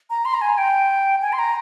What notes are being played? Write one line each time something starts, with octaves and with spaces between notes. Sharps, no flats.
A#5
C6
A#5
G#5
G5
G#5
C6
A#5